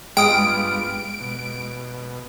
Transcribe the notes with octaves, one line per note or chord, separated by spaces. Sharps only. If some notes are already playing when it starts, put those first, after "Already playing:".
G2 G#3 B3 F4 G5 D#6 D7
B2